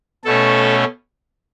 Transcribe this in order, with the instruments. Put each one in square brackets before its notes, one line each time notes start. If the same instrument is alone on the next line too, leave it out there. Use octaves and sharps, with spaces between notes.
[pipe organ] B2 A3 C#4 A4